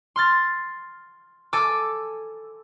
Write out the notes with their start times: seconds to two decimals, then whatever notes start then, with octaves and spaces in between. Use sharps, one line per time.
0.16 C6 F6 A6
1.53 A4 G#5 D6 E6